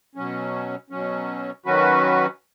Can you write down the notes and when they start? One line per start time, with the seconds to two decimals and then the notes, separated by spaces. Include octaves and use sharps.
0.15 B2 F#3 C#4
0.90 B2 F#3 C#4
1.65 D#3 F#3 C#4 F#4 B4